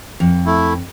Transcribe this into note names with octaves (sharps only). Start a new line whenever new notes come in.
F2
A3 E4